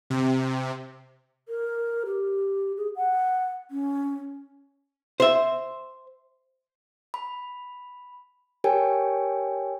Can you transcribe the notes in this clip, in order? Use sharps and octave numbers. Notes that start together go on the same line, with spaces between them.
C3
A#4
G4
G#4
F#5
C#4
C5 E5
B5
G4 A#4 C#5 G5 G#5